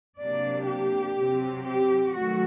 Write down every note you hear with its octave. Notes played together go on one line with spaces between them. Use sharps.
C3 F#3 A#3 D4 D5
G4
C3 F#3 C4
G4
D#3 F#3 A3 F#4